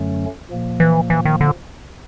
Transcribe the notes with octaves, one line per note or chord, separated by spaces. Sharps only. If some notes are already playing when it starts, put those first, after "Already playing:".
Already playing: F#2 D3 F#3 A3 C#4
A#2 F3 A#3
E3
E3
D#3
D3